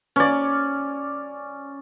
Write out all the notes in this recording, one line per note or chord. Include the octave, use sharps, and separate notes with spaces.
C#4 D5